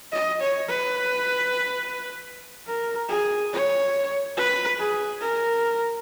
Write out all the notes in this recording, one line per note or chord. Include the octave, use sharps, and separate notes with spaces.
D#5
C#5
B4
A#4
G#4
C#5
B4
G#4
A#4